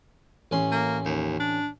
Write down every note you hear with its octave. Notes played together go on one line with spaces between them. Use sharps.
A1 C#4 C6
A#3
D#2
D4